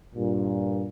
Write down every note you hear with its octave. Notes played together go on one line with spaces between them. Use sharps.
G2 A#2